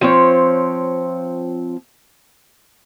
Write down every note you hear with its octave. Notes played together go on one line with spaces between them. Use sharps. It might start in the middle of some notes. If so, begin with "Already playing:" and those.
F3 C4 C#5